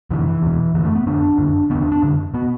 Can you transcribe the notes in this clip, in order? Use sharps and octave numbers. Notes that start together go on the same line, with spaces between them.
F#2 D3 E3
E3
E2 B2
F#2 D3 E3
A3
B3
F#2 D3 D4
F#2 D3
E2 D3 B3
D4
D4
F#2 D3
B2 B3